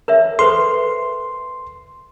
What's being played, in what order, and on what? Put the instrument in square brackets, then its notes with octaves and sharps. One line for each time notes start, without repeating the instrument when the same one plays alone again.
[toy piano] A#4 C#5 E5
[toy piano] A4 B4 C5 [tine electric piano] C6